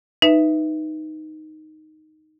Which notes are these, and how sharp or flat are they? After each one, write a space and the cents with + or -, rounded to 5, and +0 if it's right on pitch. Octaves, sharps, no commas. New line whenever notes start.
D#4 +0 B4 +0 E5 +0